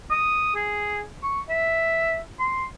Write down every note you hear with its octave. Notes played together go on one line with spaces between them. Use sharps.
D#6
G#4
C#6
E5
C6